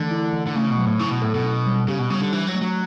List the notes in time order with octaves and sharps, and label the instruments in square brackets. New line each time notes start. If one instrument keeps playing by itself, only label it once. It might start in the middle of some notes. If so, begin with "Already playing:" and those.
Already playing: [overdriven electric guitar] D3 [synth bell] E3 A3
[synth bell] E4
E3
[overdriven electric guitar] D3
[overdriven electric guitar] C#3 [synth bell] A3
[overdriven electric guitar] B2
[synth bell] F#3
[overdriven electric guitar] A2
[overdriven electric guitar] C#3 [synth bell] E4
[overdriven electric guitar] B2
[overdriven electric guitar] A2 [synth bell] A4
[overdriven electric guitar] B2
[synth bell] C#4
G3
[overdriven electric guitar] C#3 [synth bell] G4
[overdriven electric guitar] B2
[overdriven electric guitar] C#3 [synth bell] G3
[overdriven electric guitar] D3
[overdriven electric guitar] E3 [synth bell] D4
[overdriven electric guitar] F#3
[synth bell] A3
[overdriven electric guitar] F#3